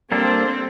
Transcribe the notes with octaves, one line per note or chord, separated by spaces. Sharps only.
G3 A#3 C4 D4 A4